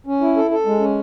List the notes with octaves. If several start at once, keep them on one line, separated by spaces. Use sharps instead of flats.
C#4
E4
A4
A4
G#3
C#4